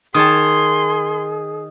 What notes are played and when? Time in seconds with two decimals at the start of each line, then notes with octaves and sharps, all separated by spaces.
0.14 D#3 G#4 C#5 A5 C6 D#6